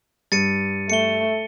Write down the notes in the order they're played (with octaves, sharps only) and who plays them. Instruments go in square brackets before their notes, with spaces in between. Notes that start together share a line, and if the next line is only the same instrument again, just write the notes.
[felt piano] G2 [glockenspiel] A6 C#7 D#7
[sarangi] A3 [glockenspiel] C#7 G7